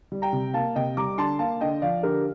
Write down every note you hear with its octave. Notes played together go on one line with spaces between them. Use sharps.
G3
G5 A#5
C3
A#3 F5 A5
C3 D#5 G5
G3 A#5 D6
D3 A5 C6
A#3 F5 A5
D3 D#5 G5
F3 D5 F5
D3 G4 A#4